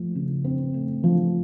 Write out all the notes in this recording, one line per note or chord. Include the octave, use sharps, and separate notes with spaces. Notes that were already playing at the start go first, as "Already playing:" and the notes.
Already playing: F3 A3
C#3
C4
A3
F3